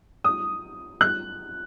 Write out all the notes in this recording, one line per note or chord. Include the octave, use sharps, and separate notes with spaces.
D#6
F#6